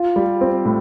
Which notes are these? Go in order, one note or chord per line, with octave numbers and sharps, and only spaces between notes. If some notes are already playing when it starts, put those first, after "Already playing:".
Already playing: F4
G3
C4
A2